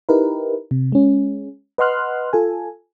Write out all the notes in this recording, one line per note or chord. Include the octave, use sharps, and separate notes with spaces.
D#4 E4 G4 A#4 B4
C3
G#3 C#4
B4 D#5 F#5 C6 F6 F#6
F4 A4 G#5